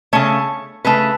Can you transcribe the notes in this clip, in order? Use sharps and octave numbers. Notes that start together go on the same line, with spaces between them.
C#3 A3 C#5
C#3 A3 B4